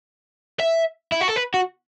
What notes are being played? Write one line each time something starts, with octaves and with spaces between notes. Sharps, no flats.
E5
E4
F#4
A4
B4
F#4